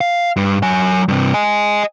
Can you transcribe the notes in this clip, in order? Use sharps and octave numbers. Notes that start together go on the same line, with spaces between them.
F5
G2
F#3 G#5
G2 C3
D#5 G#5